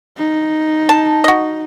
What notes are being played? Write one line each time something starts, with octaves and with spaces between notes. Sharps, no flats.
D#4
A5
F#4 D#5